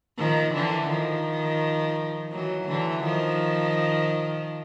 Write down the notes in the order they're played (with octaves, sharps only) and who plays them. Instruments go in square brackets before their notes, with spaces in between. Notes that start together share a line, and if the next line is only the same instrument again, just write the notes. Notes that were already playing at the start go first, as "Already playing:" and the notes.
[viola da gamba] D#3 F3
D3 E3
D#3 F3
E3 F#3
D3 E3
D#3 F3